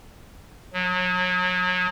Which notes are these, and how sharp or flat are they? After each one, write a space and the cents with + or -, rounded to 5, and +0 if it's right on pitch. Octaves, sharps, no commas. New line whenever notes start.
F#3 -30